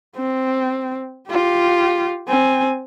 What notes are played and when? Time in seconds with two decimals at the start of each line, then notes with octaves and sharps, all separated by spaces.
0.17 C4
1.29 F4 G4
2.28 C4 G#5